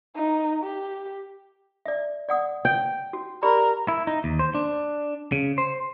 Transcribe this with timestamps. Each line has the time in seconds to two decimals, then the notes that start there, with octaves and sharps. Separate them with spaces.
0.16 D#4
0.64 G4
1.86 D5 E5
2.29 D5 F#5 D#6
2.65 G5
3.13 F#4
3.43 G4 A#4 D5 B5
3.88 E4
4.07 D#4
4.24 D#2
4.39 C5
4.55 D4
5.32 C#3
5.58 C5